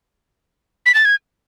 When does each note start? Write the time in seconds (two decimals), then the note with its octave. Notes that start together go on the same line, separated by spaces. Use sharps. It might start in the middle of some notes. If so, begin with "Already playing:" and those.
0.86 B6
0.94 A6
1.05 G#6